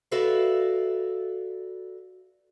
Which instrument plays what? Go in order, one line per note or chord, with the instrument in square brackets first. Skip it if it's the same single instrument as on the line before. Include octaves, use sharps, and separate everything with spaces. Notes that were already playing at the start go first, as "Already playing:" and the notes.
[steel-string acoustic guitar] F#4 A4 B4 D5 E5 F5